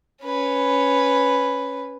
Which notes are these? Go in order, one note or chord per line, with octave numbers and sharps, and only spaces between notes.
C#4 B4